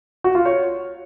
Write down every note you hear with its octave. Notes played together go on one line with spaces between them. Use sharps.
F#4
F4
C#5